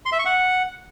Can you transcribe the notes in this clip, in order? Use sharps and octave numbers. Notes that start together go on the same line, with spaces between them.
C6
E5
C#6
F#5